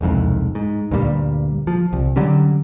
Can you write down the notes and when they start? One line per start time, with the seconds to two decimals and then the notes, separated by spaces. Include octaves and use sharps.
0.01 E1 C2 F2 G#2
0.55 G#2
0.91 D2 G2 A#2 G3
1.67 F3
1.93 C2
2.16 D3 F#3 G3 C#4